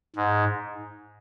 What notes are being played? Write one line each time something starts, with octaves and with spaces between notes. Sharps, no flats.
G#2